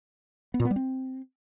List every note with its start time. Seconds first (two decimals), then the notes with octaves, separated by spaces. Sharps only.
0.54 B3
0.60 A#2
0.65 B3
0.71 G3
0.76 C4